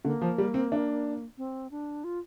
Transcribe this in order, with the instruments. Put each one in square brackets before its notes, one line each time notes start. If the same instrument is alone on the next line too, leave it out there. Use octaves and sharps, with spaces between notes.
[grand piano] D3 [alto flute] A#3
[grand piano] F3
G3
C4
D4
[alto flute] C4
D4
F4